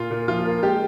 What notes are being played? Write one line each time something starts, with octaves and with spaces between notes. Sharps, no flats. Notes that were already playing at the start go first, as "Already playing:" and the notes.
Already playing: A#2 F4
A#2
F3 F4
A#3
G#3 G4